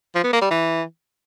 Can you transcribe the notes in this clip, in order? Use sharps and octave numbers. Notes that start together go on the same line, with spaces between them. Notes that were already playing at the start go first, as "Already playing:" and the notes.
F3
B3
A#3
G3
E3